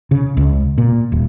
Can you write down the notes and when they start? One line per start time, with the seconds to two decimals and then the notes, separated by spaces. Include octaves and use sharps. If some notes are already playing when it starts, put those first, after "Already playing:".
0.11 C#3
0.37 C#2
0.78 A#2
1.12 D#1